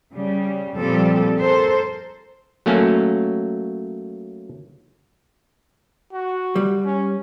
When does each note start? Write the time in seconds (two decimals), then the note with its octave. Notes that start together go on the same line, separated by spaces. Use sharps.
0.12 C#3 G3
0.76 A#2 F3 G3 C4 G4 A4
1.38 A4 A#4 C5
2.66 F#3 A3 A#3 C#4
6.12 F#4
6.56 G3
6.86 C#4